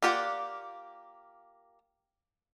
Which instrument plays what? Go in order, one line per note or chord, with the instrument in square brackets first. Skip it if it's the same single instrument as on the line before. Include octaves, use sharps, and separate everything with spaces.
[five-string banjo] A#3 F4 G4 D5 F#5